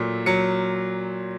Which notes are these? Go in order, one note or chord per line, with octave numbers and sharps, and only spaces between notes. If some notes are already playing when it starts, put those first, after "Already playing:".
Already playing: A#2 F#3 A3
F#3 C#7